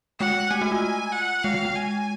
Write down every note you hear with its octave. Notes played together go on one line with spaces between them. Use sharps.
G#3 F#5
A3 G#5
F#4
F4
F#5
G#3 F5
G#3
G#3
G#5